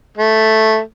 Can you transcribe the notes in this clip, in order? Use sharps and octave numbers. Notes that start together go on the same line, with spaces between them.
A3